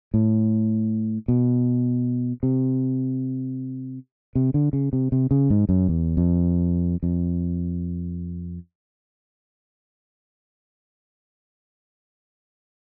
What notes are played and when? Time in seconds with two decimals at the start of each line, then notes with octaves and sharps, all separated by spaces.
0.14 A2
1.28 B2
2.43 C3
4.35 C3
4.54 D3
4.73 C#3
4.93 C3
5.12 C3
5.31 C#3
5.50 G#2
5.69 F#2
5.89 E2
6.17 F2
7.03 F2